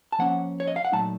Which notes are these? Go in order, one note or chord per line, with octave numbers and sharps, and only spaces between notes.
A5
F3 A#3 C#4 F#5
C#5
D#5
F5
F#5
A#2 F#3 A3 D#4 A5